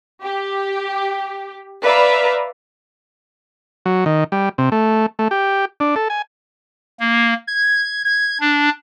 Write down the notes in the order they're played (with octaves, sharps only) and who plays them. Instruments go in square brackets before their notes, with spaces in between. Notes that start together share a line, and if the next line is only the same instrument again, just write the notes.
[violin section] G4
B4 D5 E5 F5 A#5 B5
[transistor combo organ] F#3
D#3
G3
C3
A3
A3
G4
D4
A4
G#5
[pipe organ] A#3
G#6
G#6
D4